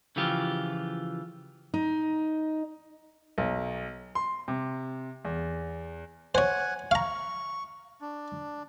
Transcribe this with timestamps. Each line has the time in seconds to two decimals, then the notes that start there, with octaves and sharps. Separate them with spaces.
0.16 C#3 E3 F3 F4 G4
1.74 D#4
3.38 B1
4.15 C6
4.48 C3
5.25 E2
6.35 C5 C#5 F#5 G#5
6.91 F5 A#5 C#6
8.01 D4